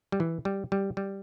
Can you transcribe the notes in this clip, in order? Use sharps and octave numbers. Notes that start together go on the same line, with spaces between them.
G3
E3
G3
G3
G3